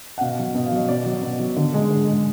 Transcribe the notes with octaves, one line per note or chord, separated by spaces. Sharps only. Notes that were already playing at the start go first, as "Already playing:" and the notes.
F#5
B2 F5
F#3
B2 D#5
F5
F#3 D#5
B2 D5
F#3
B2
F#3
D3
G#3
D3
G#3